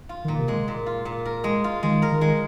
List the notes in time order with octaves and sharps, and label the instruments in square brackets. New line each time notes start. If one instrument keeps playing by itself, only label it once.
[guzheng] F4
[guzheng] A#2 [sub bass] D#3
[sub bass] C3
[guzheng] G#3
A#2
F4
A#2
A#4
G#3
F4
[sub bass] D#3 [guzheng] G#3
[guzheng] A#4
[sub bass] D#3
[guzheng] G#3